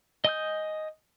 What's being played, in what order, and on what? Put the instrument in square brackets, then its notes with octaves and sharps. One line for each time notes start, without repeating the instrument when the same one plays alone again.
[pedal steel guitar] D#5 G#5 D#6 G6